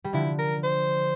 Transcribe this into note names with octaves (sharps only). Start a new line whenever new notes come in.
G3
D3 F3 E4
A#4
C5